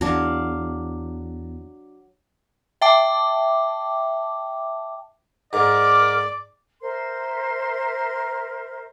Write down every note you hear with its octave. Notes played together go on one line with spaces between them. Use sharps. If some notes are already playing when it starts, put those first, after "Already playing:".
E2 F#3 D4 F5
E5 G5 A5 D6
G#2 A#4 D5 D6
A#4 C5 E5 C6